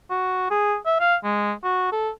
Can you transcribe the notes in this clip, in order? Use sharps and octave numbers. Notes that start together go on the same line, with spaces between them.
F#4
G#4
E5
F5
G#3
F#4
A4